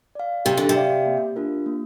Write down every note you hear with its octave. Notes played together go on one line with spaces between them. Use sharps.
D5 F5
C3 G4
D3
C3
D5 F5
A#3
D4 F4 A#4
A#3